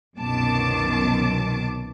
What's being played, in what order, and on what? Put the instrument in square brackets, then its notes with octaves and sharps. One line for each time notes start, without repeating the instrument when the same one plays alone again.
[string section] C2 F#2 B2 D#3 A5 D6